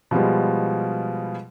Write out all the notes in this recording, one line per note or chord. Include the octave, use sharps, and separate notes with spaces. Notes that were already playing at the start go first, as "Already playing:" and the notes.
B2 F3 G3 G#3